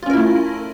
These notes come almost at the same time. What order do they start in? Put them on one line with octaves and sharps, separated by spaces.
F4 C#4 A#4 E4 A3